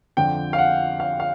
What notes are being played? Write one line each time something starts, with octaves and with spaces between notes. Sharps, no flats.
F2 D3 F3 G5
F5
F#5
F5
F5